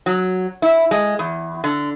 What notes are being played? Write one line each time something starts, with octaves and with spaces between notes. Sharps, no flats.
F#3
E4
G#3
E2
D3